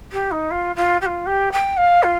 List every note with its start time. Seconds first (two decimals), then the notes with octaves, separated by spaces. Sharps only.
0.12 G4
0.31 D#4
0.50 F4
0.75 F4
1.01 G4
1.05 F4
1.26 G4
1.52 G5
1.77 F5
2.03 F4